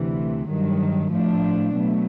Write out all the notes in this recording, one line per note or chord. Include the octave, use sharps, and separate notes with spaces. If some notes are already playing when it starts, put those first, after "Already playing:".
Already playing: D2 C3 E3
G2 D#3 F#3
A2 F3 A3 D4
B2 F#3 A3